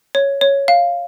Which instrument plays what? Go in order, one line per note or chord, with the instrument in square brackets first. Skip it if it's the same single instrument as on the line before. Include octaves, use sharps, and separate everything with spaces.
[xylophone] C#5
C#5
F5